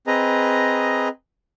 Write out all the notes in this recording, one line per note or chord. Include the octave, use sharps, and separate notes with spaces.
C4 G#4 B4 D#5 A#5